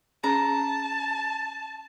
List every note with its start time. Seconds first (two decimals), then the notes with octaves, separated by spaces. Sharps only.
0.24 C#4 G#4 A5 A#5